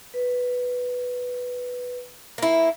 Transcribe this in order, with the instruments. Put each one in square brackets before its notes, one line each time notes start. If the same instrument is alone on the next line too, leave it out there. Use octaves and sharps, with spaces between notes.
[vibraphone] B4
[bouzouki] A#3 E4